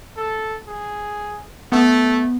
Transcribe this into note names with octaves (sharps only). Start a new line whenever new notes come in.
A4
G#4
A3 B3